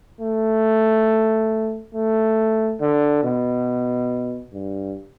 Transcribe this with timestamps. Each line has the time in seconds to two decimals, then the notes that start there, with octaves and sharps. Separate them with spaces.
0.21 A3
1.95 A3
2.81 D3
3.24 B2
4.53 G2